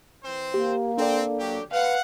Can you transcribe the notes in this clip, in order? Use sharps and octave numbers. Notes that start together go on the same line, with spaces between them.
E3 C4 C5
A#3 G4
C4 D4 A4 D5
F#3 G4
B4 F5 F#5